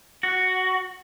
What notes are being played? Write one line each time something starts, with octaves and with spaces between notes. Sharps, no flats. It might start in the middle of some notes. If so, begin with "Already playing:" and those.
F#4